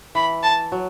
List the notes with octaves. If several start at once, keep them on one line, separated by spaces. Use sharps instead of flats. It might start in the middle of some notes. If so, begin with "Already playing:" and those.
E3 B5
A5
F#3